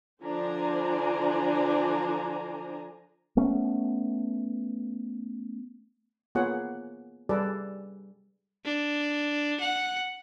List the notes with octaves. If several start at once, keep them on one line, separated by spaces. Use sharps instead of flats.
D3 F3 D4 C5 G#5 A#5
A3 B3 C#4
A#3 B3 F4 G#4 C#5 F#5
G3 G#4 A4 B4 D5
D4
F#5